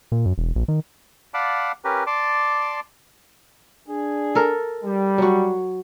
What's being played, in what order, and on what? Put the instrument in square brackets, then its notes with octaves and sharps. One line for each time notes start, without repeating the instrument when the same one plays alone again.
[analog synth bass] A#2
F#2
E1
A#1
D#3
[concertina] D5 F5 F#5 A5 B5 D6
C#4 G4 A#4 B4
D5 A5 C6 D6
[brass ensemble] D4 G#4
[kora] A4 A#4
[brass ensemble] G3
[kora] F#3 F#4